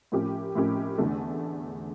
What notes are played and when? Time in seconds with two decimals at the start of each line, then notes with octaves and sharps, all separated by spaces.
0.12 A2 F3 C#4 G4 A#4
0.55 A2 F3 C#4 G4 A#4
0.98 E2 D3 A3